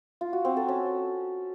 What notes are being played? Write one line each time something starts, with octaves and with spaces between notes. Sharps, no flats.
F4
F#4
C4
A4
C#4